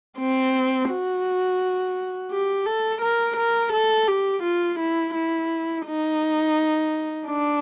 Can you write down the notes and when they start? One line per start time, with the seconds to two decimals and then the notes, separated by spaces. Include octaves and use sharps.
0.18 C4
0.89 F#4
2.31 G4
2.66 A4
3.01 A#4
3.37 A#4
3.73 A4
4.08 G4
4.43 F4
4.79 E4
5.14 E4
5.85 D#4
7.27 D4